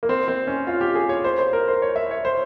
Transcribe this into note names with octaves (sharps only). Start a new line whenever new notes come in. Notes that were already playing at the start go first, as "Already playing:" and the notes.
A#3
C4
C4
C#4
F4
G4
G#4
C#5
C5
C5
A#4
C5
C#5
E5
C#5
C5